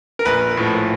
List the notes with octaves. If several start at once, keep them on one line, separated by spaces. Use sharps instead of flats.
A#4
A#1 B4
A2 F3